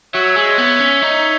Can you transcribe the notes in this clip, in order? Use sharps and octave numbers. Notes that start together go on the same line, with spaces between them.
F#3 C#5 E5
G#3
B3
C#4
D#4